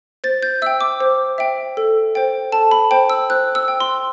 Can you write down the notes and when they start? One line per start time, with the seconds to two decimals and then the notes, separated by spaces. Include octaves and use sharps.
0.24 C5 A6
0.43 G6
0.62 E5 G5 E6
0.81 D6
1.00 C5
1.38 E5 G5
1.77 A4
2.15 C5 G5
2.52 A4 A5
2.71 B5
2.91 C5 G5
3.10 E6
3.30 C5 F#6
3.55 E6
3.68 G5
3.80 C6